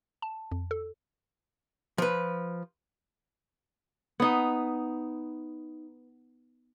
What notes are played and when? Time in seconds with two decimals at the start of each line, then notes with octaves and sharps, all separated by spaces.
0.22 A5
0.52 F2
0.71 A4
1.98 F3 B4
4.20 B3 D#4